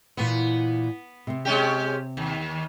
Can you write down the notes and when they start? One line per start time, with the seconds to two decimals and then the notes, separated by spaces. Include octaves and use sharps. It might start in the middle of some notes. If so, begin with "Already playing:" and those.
0.17 A#2 E3 B3
1.27 C3 C4
1.45 G#3 C#4 G4
2.17 D#2